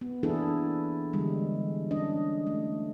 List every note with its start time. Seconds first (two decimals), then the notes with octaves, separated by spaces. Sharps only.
0.01 B3
0.23 E3 A#3 D4 E4 G#4 A4
1.13 D3 E3 G3 G#3
1.91 C#4 D4 D#5
2.47 A3